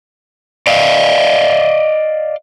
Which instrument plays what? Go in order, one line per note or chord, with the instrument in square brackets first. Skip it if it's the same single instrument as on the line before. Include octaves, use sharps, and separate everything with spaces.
[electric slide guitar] D5 D#5 F5